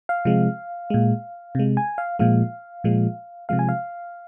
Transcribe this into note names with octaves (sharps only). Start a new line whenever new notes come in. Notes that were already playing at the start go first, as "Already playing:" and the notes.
F5
C3 F3 G#3
A#2 G#3
C3 G#3
G#5
F5
A#2 F3 G#3 F5
A#2 F3 G#3
C3 F3 G#3 F5
G#5
F5